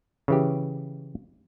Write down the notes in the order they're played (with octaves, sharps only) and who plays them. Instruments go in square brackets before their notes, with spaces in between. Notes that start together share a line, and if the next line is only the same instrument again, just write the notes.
[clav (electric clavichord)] C#3 E3 G4